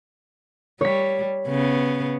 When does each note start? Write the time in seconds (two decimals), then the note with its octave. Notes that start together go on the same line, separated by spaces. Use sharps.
0.81 G3 C#5 B6
1.47 C#3 B3